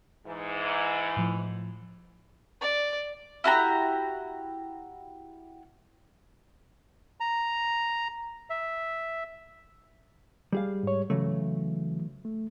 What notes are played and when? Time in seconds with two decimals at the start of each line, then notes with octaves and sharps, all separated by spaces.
0.26 G#2 E3
1.17 A2 F3
2.62 D5
3.44 E4 F#4 G4 A#5
7.20 A#5
8.50 E5
10.52 G3 G#4 F5
10.83 G#2 C#5
11.10 C#3 E3 F#3 A3
12.25 A3